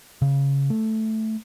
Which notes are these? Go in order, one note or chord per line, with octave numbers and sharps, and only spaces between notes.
C#3
A3